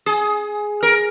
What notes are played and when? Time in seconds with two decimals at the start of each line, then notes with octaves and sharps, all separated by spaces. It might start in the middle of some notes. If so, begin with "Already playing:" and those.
0.06 G#4
0.83 A#4